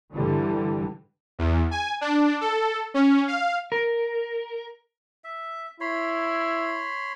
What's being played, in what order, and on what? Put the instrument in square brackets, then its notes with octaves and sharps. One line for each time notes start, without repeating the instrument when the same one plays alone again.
[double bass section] G2 D3 E3 G3
[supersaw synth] E2
G#5
D4
A4
C#4
F5
[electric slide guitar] A#4
[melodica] E5
[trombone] E4 [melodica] C#5 B5 C6